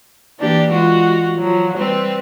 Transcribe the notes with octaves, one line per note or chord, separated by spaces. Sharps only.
E3 A#3 D4 G4
G#3 F4 F#4
F3 F#3
G3 C4 B4